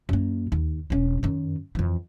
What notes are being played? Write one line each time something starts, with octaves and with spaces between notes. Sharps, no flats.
F#2 A#3
D#2
E1 C#4
F#2 D#3
F2 E3